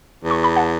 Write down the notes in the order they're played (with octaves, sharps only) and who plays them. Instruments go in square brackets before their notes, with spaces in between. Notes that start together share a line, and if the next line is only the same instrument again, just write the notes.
[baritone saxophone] E2
[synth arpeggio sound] C#6
B5
F#5 A5